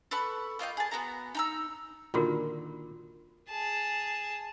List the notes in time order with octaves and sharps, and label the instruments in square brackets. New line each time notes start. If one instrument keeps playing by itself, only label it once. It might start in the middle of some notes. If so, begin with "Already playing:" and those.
[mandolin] A4 B4 B5 C#6
A#3 F4 D#5 G5
G#4 A5
B3 D#4 F#4 A#5
D#4 A#5 E6
[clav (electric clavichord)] A#2 D3 D#3 [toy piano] F4 F#4 A#4
[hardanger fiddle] G#4 A5